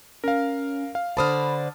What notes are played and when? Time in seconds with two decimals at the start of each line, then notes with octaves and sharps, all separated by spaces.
0.24 C#4 A#4 F5
0.95 F5
1.17 D3 C5 D5 A5 B5 D#6 F6